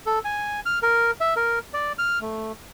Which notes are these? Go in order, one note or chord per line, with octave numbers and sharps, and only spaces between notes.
A4
G#5
F6
A#4
E5
A#4
D5
F6
A3